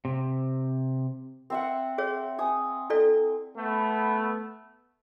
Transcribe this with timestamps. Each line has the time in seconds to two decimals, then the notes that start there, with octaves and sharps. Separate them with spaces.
0.05 C3
1.50 C4 E5 F#5
1.98 G#4 C#5
2.39 G#5 D#6
2.90 E4 A4 D5
3.57 A3 B3